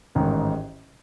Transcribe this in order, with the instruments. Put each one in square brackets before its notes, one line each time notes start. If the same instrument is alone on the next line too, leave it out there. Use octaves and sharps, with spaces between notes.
[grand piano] A1 G#2 D#3